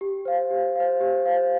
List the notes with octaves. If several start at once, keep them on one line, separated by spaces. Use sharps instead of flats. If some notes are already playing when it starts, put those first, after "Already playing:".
G4
C5 F5
G4
C5 F5
G4
C5 F5